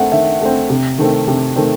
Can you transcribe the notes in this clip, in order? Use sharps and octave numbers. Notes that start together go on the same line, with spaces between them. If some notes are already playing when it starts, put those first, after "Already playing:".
Already playing: A3 C4 E5 F#5
D#3 E5
A3 C4
C3
D#3 A3 C4
C3
D#3 A3 C4